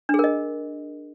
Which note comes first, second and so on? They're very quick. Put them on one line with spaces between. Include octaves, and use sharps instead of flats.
D4 G#4 A#4 D#5